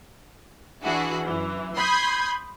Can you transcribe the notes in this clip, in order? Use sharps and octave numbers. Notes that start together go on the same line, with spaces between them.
E3 D4 E4 F#4 G#4
F#2 E3
B5 C6 D#6 G6 G#6